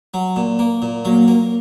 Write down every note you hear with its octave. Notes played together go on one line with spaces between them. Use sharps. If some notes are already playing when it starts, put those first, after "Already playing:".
F#3
A#2
A#3
A#2
F#3 A#3
A#3